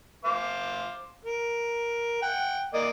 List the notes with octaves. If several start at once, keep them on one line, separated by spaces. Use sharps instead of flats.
C5 F5 D6
A#4
F#5 G5
A#3 D5 D#5